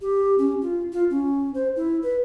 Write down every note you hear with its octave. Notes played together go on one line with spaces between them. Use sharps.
G4
C#4
F4
F4
C#4
C5
E4
B4